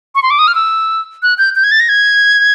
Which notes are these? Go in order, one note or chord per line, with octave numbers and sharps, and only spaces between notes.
C#6
C6
D6
D#6
F6
E6
F#6
G6
G6
G#6
A6
A#6
G#6